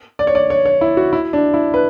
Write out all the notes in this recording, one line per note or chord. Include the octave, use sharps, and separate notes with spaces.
D5
C#5
D5
C#5
C#5
E4
F#4
E4
D4
E4
B4